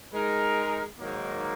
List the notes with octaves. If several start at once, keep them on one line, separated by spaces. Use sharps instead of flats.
G#3 D#4 A#4
G#2 D#3 F#3 A#3